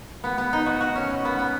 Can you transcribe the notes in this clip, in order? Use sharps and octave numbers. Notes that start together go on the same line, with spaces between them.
B3
B3
D#4
F#4
F#4
C#4
B2
B3
B3